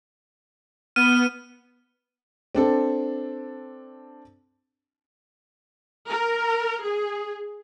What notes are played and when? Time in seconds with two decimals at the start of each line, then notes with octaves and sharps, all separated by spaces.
0.96 B3 F6 D#7
2.55 C4 D4 A4
6.10 A#4
6.82 G#4